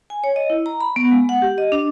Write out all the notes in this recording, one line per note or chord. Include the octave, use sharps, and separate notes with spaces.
G#5
C#5
D#5
E4
A#5
B5
B3
G#3
F#5
G4
D#5
D4